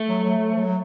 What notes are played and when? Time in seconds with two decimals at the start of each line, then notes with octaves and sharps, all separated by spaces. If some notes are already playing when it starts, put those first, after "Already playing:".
Already playing: A3
0.08 F#3
0.24 F#3
0.38 F#3
0.53 F3
0.59 F#3